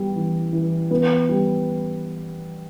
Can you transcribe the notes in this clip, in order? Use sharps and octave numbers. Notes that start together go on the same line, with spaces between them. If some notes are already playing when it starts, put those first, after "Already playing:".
Already playing: G3 B3
E3
E3
B3
G3